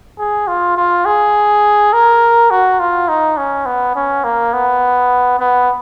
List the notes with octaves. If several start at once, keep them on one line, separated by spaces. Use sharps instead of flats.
G#4
F4
F4
G#4
A#4
F#4
F4
D#4
C#4
B3
C#4
A#3
B3
B3